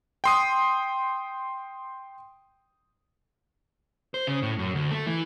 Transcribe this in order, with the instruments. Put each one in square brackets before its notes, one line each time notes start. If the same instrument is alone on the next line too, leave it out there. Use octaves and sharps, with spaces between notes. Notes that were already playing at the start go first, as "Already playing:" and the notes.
[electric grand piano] G5 C6 D#6
[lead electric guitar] C5
C#3
A2
F#2
D2
A3
E3